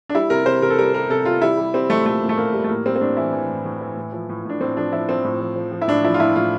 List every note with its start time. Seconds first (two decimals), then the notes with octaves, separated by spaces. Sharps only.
0.09 D4
0.15 G3 E4
0.30 C3 A#4
0.46 C3 C5
0.62 C3 A#4
0.70 A4
0.78 G3 A#4
0.94 G3 A#4
1.10 C3 A4
1.25 G3 F4
1.41 G3 E4
1.57 G3
1.74 G3 C4
1.89 G3 A3
2.05 A#2 A3
2.21 A#2
2.29 A3
2.37 A#2 A#3
2.53 G3
2.64 A3
2.69 A2 A#3
2.86 G3 C4
2.96 C4
3.01 A2 D4
3.17 E3 E4
3.33 E3
3.49 A2
3.65 A2
3.81 E3
3.97 A2
4.12 F3
4.29 A2
4.45 A2 D4
4.60 A2 C4
4.77 F3 D4
4.92 F3 E4
5.09 F3 C4
5.24 A2
5.41 F3
5.56 F3
5.72 F3
5.82 E4
5.87 A2 D4
6.04 F3 E4
6.14 F4
6.20 A2 E4
6.36 A2 F4